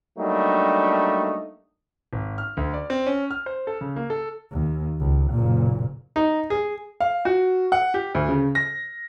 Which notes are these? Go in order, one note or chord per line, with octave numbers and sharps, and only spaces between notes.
F#3 G3 A3 A#3 D4 D#4
G#1
F6
D2
D5
C4
C#4
F6
C5
A4
C#3
A#3
A4
D#2
C#2
F#1 A#2
D#4
G#4
F5
F#4
F#5
G4
D2
C#3
A#6